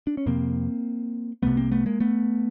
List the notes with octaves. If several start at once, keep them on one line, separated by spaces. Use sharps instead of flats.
D4
C#4
F2 C3 A#3 C4
C2 C3 A3 B3
A#3 C4
A3 B3
G#3 A#3
A3 B3